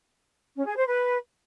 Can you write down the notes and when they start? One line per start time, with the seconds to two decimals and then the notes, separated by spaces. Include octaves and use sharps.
0.57 C#4
0.67 G#4
0.77 C5
0.87 B4